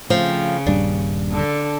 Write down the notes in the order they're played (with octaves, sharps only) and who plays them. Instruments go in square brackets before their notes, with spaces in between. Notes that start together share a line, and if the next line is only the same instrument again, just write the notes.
[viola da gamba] C#3 [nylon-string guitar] F3 A3 C4
[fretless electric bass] D#1 G2 [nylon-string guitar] D4
[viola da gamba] D3 A4